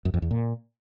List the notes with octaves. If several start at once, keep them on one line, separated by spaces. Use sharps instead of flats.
F#2
F2
E2
A#2